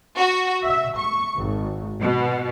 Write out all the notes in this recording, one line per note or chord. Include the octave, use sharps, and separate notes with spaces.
F#4
E5
C#6
G#1
B2